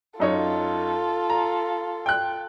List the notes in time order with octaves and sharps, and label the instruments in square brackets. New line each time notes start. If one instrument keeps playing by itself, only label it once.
[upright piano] F#2 D#4 C#5 [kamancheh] F4 A4
[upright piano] A#5
G5 F#6